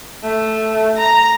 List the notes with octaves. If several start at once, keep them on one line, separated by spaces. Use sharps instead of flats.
A3
A#5